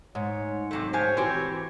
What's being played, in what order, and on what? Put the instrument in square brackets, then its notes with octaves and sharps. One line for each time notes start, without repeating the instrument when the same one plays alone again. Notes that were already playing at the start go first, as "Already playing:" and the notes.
[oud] G#2 [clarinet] C#5
[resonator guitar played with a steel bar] C3 F#3 A3
[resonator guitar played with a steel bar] F3 G4 G#5 [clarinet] C5 [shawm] C#5
[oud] E3 [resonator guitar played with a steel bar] C4 G4 [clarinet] F#4